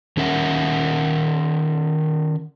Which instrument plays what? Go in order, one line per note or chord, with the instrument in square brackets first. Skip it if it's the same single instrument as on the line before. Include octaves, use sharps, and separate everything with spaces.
[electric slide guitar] D#3 C#4 A#4 E5 F#5